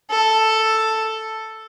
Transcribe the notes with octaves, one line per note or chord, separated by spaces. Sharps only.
A4